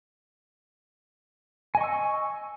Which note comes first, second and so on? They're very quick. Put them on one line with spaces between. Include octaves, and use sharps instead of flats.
G#5 D#5 C#6 E6